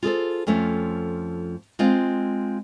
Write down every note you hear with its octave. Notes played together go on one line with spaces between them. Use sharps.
F4 G#4 A4 C5
F2 F3 A3 C#4
G#3 C4 F4 F5